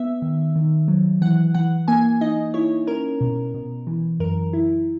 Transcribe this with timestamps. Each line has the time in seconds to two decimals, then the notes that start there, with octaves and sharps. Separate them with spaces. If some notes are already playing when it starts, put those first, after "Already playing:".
Already playing: B3 E5
0.22 D#3
0.56 D#3
0.88 F#3
1.22 E3 F#5
1.54 E3 F#5
1.88 A#3 G#5
2.21 D#4 D#5
2.54 E4 C#5
2.87 C#4 A#4
3.21 B2
3.54 B2
3.87 E3
4.20 F#2 A#4
4.53 E4